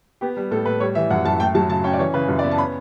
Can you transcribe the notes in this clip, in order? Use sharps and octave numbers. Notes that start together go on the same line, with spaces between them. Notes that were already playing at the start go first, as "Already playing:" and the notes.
B3 G4
G3
A2 A4
A2 B4
G3 C#5
E3 E5
F#2 F#5
F#2 A5
A3 G5
F#3 A5
C#3 A5
C#4 G5
D5
E3 C#5
C#3 B4
F#2
D5
B3 E5
A5
C#4 B5